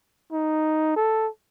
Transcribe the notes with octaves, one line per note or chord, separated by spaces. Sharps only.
D#4
A4